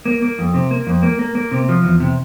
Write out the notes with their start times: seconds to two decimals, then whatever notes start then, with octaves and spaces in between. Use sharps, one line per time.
0.05 A#3
0.22 A#3
0.39 F2
0.54 C3
0.71 A#3
0.87 F2
1.03 A#3
1.19 A#3
1.35 A#3
1.51 C3
1.69 F3
1.84 E2
2.00 C3